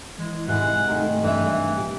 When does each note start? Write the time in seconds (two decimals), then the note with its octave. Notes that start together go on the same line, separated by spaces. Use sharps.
0.18 E3 G#3
0.48 G#2 C3 E3 G#3 F#5
0.87 D#3 G#3 A3 A#4
1.23 G2 E3 E5
1.77 A#2 G4